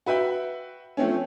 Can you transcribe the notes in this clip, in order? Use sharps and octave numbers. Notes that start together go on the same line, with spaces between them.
F#4 B4 E5 G5 B5
F3 A3 C4 C#4